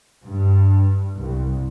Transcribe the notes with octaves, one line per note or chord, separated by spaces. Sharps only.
G2
C2